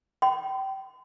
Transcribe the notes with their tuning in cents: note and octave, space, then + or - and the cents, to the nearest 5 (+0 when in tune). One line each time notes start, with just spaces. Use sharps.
G5 -20 C6 -45